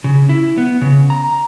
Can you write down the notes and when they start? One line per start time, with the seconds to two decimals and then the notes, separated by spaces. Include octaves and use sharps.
0.04 C#3
0.29 E4
0.58 B3
0.82 C#3
1.10 A#5